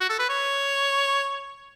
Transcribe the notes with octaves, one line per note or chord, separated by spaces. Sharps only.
F#4
A4
B4
C#5